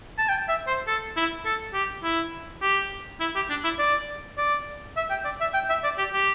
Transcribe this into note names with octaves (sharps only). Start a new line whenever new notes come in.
A5
G5
E5
C5
A4
E4
A4
G4
E4
G4
E4
G4
D4
E4
D5
D5
E5
G5
D5
E5
G5
E5
D5
G4
G4